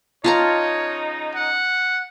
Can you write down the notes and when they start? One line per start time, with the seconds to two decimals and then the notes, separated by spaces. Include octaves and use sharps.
0.24 C#3 D#4 F4 C#5 A5 A#5
1.35 F#5